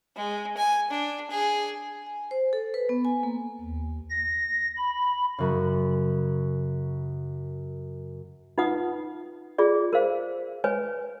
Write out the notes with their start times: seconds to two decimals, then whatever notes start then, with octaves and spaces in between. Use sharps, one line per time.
0.16 G#3
0.57 G#5
0.90 D4
1.31 G#4
2.07 G#5
2.31 C5
2.53 A4
2.74 B4
2.89 B3
3.05 G#5
3.23 A#3
3.61 D#2
4.10 A#6
4.77 B5
5.38 F#2 C#3
8.58 D#4 F4 B4 F#5 D#6
9.58 F4 G#4 D5
9.93 A#4 C5 F5
10.64 B4 C#5 G#5